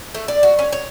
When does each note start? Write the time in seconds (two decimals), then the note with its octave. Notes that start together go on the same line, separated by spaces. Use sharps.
0.15 A3
0.28 D5
0.43 F#4
0.59 C#4
0.72 C#5